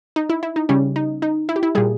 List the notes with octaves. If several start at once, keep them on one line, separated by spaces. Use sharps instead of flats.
D#4
E4
E4
D#4
C#3 G3 C#4
D#4
D#4
E4
G4
E4
A#2 G3 G#4